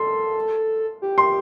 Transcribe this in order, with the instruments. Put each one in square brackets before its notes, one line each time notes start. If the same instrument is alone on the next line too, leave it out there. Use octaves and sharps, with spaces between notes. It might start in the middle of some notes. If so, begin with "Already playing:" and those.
Already playing: [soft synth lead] A4 [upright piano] C6
[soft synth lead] G4
[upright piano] C6